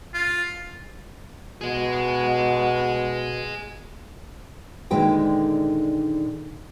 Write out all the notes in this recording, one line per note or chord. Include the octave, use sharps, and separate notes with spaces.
F4
B2 G#4 D#5
A#2 D3 D#3 G#3 B4 G5